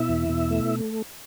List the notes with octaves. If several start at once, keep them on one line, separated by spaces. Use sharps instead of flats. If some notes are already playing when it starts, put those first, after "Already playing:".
Already playing: B2 E4 E5
E2
B2
A3